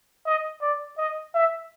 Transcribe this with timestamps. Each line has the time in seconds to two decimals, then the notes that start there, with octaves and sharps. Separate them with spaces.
0.26 D#5
0.62 D5
0.98 D#5
1.34 E5